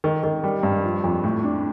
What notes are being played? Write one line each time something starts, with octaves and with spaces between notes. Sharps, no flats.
D#3
D#3
G3
G2
F3
F2
A2
D4